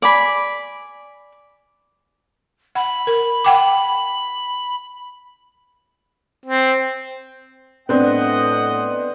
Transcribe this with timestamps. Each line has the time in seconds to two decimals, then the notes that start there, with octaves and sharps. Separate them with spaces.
0.02 D5 G#5 B5
2.75 F#5 B5
3.07 A#4
3.44 F#5 G5 D6
6.46 C4
7.89 A2 B3 C4 D4 D#5 F#5